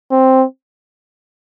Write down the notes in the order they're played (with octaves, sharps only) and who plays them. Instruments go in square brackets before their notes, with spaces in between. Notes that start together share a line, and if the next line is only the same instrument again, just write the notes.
[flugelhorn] C4